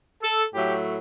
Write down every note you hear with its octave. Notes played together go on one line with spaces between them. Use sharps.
A4
A2 F#3 A3 G4